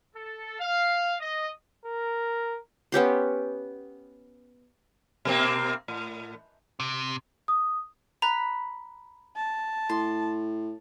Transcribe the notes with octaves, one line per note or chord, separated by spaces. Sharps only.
A4
F5
D#5
A#4
B3 C#4 G4 C6
B2 A#3 C4
A2
C3
D#6
A#5 B5 F#6
A5
A2 C6